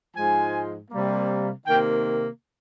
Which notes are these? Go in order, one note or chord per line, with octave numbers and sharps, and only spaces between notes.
G#2 F3 G#3 G#5
C3 G3 A#3
C3 D#3 A#3 G5